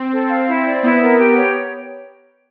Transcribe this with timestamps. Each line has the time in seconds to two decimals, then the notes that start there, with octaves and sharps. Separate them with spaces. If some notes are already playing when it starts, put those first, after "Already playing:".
Already playing: C4
0.12 A4
0.29 F5
0.47 E4
0.65 D5
0.83 B3 E4
1.01 A#4
1.19 G4
1.37 C#5